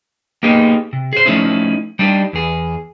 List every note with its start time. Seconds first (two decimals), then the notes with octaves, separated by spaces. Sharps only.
0.43 A#3 B3 D#4 G4 G#4
0.93 C3
1.13 G#4 C5
1.26 F3 F#3 A3 C#4 D#4 E4
1.99 G3 D4 D#4 G4
2.33 E2 G#4